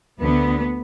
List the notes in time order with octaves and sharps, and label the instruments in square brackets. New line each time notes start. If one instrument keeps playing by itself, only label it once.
[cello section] D2 D3 B3